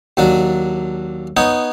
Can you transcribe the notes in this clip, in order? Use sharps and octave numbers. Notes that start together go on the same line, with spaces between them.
D#2 F#3 D4
B3 D#4 C#5